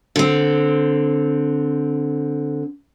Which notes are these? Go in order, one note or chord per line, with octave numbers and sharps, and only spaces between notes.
D3 C4